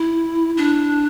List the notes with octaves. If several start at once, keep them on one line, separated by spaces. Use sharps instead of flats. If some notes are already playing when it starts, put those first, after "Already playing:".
Already playing: E4
D4